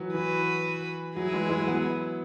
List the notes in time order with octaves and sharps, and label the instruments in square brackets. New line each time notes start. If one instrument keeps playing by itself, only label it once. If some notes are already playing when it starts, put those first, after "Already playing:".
Already playing: [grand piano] E3 F#3
[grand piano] E3 [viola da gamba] F#4 B4
[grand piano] F#3 [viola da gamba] E4 G#4
[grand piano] E3 G#3
E3 G#3
F#3 B3